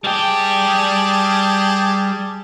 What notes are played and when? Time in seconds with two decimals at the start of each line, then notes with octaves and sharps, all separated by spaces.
0.04 G3 G4 G#4 G5 A5